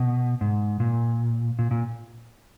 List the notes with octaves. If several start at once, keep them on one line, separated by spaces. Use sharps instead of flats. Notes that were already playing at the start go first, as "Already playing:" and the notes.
Already playing: B2
G#2
A#2
A#2
A#2